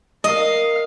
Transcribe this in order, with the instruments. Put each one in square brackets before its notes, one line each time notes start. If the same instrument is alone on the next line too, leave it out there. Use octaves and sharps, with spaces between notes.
[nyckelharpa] A#4 F5 [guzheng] D#5